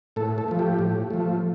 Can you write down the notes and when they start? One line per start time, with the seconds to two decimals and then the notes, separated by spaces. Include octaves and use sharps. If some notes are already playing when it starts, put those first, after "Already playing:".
0.16 A2 A4
0.38 A4
0.48 F3 A3
0.59 G4
0.79 A2
1.10 F3 A3